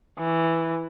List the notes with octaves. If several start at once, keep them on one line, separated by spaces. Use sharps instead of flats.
E3